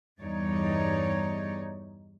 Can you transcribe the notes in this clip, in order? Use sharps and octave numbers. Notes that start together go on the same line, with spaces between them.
E2 G2 G3 D#4 C#5 D5